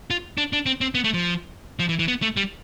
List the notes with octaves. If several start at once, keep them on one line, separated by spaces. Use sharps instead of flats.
F4
D4
D4
C4
C4
B3
A3
F3
F3
E3
E3
B3
A3
G3